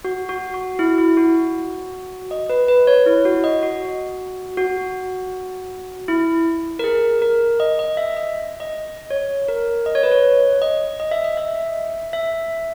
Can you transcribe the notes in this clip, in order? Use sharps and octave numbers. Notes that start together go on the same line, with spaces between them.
F#4
F#4
F#4
E4
E4
F#4
D#5
B4
B4
C#5
E4
F#4
D#5
F#4
F#4
E4
A#4
G#4
A#4
D#5
D#5
E5
D#5
D#5
C#5
A#4
D#5
C#5
B4
C#5
D#5
D#5
E5
D#5
E5
E5